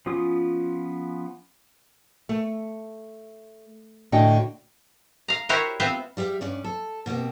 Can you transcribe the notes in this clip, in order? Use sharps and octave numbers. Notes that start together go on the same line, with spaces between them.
F3 B3 C#4 F4 D#6
A3
A2 D3 F#4 D#5 G5
F5 A#5
E4 F#4 G4 A#4 C5 C#5
B3 C4 F4 C5 E5
G3 G4 E5 F5
G2 C#4 D5
A4
B2 A#3 C4 G4